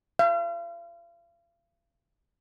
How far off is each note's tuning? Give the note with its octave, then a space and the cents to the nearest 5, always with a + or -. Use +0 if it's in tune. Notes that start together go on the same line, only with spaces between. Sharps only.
F5 -40